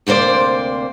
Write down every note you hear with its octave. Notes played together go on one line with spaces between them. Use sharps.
D2 C3 A#3 C5 D5